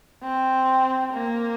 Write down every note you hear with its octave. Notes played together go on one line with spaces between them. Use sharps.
C4
A#3